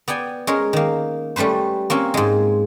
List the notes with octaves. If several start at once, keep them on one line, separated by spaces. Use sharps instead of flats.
B3 D5 G5 G#5
G#3 C#4 A#4
D#3 A#3
G3 A3 C#4 B4 C5
A#3 C4 C#4 F4
G#2 G#3